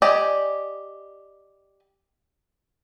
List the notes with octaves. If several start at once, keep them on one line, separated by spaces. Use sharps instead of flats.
G4 D5 D#5 G#5